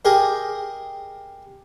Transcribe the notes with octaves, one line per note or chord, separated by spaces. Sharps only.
G4 G#4 A#4 D#5